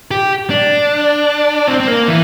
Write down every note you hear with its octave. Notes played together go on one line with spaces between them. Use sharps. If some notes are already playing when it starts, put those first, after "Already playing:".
G4
D4
C4
C4
A#3
E3